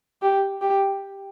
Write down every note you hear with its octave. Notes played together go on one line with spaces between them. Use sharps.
G4
G4